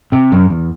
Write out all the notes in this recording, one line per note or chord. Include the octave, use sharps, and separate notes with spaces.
C3
F#2
E2